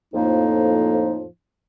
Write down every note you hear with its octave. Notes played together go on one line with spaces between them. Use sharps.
F2 A2 F3 A#3 D#4